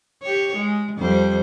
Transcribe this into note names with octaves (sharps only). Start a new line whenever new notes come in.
G4 C#5
G#3
F2 G3 C5